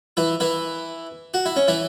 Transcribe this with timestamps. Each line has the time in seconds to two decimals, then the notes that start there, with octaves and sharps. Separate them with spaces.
0.17 E3 E4
0.40 E3 E4
1.34 F#4
1.46 E4
1.56 C#4
1.68 E3 E4